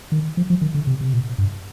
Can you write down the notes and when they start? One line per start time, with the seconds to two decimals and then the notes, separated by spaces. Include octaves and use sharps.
0.12 D#3
0.37 F3
0.50 F3
0.61 D#3
0.74 D3
0.87 C3
1.01 C3
1.13 A#2
1.38 G2